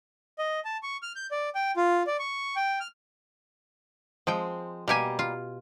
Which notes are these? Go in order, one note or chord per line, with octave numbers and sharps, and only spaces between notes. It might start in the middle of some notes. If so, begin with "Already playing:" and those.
D#5
A5
C#6
F6
G6
D5
G5
F4
D5
C#6
G5
F6
F3 G#3 C4 G5
B2 G3 A#3 G4 G#5
F4